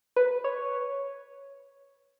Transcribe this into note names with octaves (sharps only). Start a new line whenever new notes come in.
B4
C#5